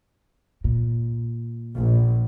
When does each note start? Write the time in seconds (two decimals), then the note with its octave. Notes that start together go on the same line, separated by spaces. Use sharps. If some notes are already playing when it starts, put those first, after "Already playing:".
0.64 A#2
1.75 A#1